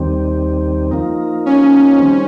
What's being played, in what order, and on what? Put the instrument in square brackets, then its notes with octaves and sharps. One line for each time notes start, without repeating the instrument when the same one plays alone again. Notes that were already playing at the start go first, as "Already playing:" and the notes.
Already playing: [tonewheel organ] D#2 D#3 G3 C4
F3 A#3 D#4
[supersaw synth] C#4
[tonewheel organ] D#3 G3 C4